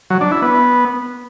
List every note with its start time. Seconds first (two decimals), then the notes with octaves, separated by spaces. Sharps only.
0.10 F#3
0.21 D4
0.32 E4
0.42 B3